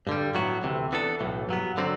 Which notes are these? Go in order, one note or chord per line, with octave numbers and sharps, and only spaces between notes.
G2 D3 G3
A2 F#3 B3 F#4
D2 C3 E3
E3 B3 D4 A4
B1 A2 E3
G2 F#3 B3
D3 F#3 C4 F#4